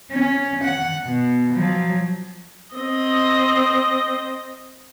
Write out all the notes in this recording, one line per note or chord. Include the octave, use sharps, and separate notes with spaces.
C#4
F#5
B2
F3 F#3
C4 D#5